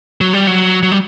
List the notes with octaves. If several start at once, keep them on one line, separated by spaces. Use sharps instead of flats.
F#3
G3
F#3
F#3
G3